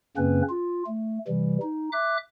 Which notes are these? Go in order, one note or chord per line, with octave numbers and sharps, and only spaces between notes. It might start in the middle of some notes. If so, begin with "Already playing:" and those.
F#2 C#3 A#3 C4 C#4 B4
F4
A3
C3 E3 G3
D#4
E5 D6 F#6